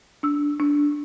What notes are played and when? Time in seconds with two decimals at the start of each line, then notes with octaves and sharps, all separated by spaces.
0.23 D4 E6
0.60 D4